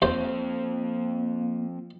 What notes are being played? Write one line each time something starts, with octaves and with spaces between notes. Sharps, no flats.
D#2 F3 A#3 C4 C5